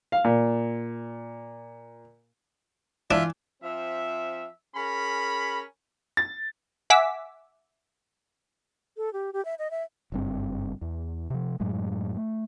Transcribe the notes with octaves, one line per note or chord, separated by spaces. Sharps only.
F5
A#2
E3 D4 F4 E5
F3 C4 E5
C#4 G#4 A#4 B5
A6
E5 F#5 G#5 D6 E6 B6
A4
G4
G4
E5
D#5
E5
F#1 G2 C4
E2
C3 F3
F#2 A2 F#3 G#3
A3